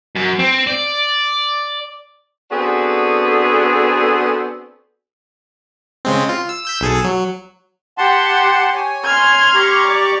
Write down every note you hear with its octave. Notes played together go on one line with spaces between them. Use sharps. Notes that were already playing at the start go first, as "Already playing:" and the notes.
F#2
C4
D5
B3 C4 D4 F#4 G#4 A4
C#3 G#3 C4
F4
E6
E6 G6 B6
B1 G#4 A4
F#3
G4 F#5 A5 C6
C#5 G#5
C6 F6 G#6
G4 A#5 C#6
D5